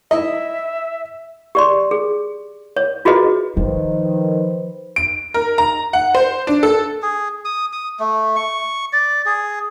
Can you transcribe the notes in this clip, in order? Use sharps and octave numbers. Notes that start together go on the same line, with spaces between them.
E4 D#5 E5
G4 D5 C6
G#4
C#5
F4 F#4 G#4 B4 D#5
D#3 F3 B4 C5
D7
A#4
A#5
F#5
C5
D4
A4
G#4
D#6
D#6
A3
C#6
D5
G#4